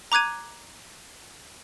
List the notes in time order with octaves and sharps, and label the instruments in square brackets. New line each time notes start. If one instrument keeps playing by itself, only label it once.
[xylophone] A#5 D6 F#6 G#6 D#7